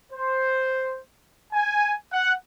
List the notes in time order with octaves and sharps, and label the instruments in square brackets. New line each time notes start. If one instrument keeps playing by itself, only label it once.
[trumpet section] C5
G#5
F#5